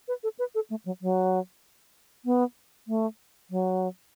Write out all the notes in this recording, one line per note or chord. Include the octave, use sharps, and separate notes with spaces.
B4
A4
B4
A4
A3
F#3
F#3
B3
A3
F#3